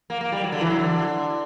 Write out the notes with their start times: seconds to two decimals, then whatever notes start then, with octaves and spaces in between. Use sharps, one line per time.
0.10 A#3
0.21 A#3
0.32 G3
0.44 F#3
0.52 D3
0.61 E3
0.70 F#3
0.79 D3